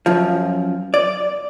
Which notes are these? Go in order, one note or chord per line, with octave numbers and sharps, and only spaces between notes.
F#2 F3
D5